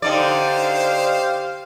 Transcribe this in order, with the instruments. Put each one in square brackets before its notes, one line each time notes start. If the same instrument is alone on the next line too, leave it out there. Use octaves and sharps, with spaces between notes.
[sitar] D3 D#4 D5 [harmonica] G4 C5 F5